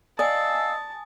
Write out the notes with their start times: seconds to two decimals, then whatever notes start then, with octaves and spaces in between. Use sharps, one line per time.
0.19 D5 D#5 F5 G#5 A5 D#6 E6